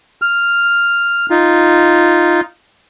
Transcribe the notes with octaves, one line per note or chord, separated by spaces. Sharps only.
F6
D#4 F4